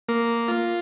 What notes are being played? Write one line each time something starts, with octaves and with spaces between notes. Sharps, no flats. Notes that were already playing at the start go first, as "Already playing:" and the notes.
A#3
F4